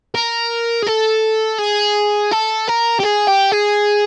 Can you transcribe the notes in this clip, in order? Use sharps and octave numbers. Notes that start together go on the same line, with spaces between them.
A#4
G#4
A4
G#4
A4
A#4
G4
G#4
G4
G#4